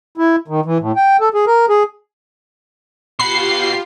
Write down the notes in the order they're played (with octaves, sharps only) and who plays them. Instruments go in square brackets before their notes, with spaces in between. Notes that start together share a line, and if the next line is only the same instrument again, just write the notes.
[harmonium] E4
D#3
E3
A2
G5
A4
G#4
A#4
G#4
[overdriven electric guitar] B2 F#5 [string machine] F4 G4 [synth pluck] B5 [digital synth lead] C7